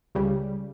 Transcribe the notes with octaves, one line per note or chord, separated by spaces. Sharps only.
C#2 C#3 G3